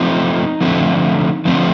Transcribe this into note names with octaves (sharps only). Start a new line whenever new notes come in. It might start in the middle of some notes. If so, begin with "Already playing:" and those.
Already playing: F3 A3 C4 D#4
D3 F3 A3 C4
D3 F3 A3 C4